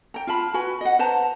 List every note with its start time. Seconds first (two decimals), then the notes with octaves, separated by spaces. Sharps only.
0.14 G5 A#5
0.27 F4 F5 A5 B5
0.54 F#4 B4 G#5 B5
0.81 D#5 F#5
0.99 B4 C5 A5 A#5